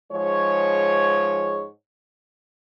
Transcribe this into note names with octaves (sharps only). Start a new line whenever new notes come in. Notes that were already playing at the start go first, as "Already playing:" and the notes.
G#2 F3 G#3 G#4 C#5